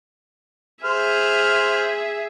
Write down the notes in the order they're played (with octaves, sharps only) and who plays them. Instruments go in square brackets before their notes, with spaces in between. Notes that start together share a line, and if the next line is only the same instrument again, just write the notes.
[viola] G#4 E5 [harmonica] C5 F6